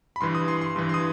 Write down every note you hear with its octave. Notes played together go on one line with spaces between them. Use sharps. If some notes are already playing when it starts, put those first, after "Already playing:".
B5
G2 E3 C6
D#6
C6
C6
G2 E3
C6
D#6